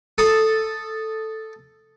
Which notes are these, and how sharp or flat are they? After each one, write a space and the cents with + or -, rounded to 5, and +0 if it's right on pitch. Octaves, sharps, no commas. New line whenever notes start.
A4 +0 D#6 -5